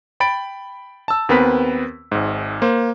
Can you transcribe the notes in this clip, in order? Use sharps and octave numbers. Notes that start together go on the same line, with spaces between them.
G5 B5 A6 D7
A5 E6
D#2 B3 C4 A#4 B4 B6
G#1 G#2
A#3 C5